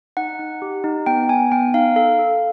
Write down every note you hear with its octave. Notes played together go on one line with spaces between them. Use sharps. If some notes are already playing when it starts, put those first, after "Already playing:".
D#4 F#5
D#4
G4
D#4
B3 G5
B3 G#5
B3 G5
D#4 F5
A4 F5
A4